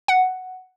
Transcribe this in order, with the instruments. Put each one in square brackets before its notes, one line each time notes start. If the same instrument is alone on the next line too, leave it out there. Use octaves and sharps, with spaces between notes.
[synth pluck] F#5